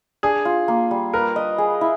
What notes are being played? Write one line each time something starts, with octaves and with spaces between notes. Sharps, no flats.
D4 G#4
F4
A#3
G3
A#4 B4
D#5
G#4
E4